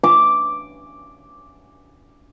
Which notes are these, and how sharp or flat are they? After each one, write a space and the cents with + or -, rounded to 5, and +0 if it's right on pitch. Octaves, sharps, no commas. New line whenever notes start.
D6 +0